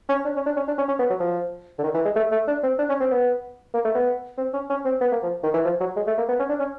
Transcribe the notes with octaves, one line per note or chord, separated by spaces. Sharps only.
C#4
D4
C#4
D4
C#4
D4
C#4
C#4
B3
F#3
F3
D3
D#3
E3
G#3
A3
A3
D4
C4
D4
C#4
C4
B3
A#3
A3
B3
C4
C#4
C#4
C4
B3
A#3
F3
D#3
E3
F3
F#3
G#3
A3
A#3
B3
C#4
D4
C#4